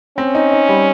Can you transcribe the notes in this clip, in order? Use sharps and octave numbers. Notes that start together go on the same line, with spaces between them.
C4 C#4
D#4
D#4
G3